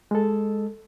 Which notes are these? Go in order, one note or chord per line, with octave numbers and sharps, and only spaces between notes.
G#3 A4